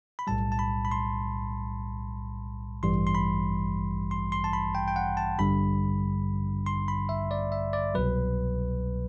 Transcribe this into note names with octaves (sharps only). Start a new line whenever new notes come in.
B5
B1 A2 G3 A5
A5
B5
B5
C6
A1 G2 E3 G3 C6
C6
B5
C6
C6
A5
B5
G5
G5
F#5
A5
A1 G2 D3 G3 B5
C6
B5
E5
D5
E5
D5
C2 B2 F#3 B4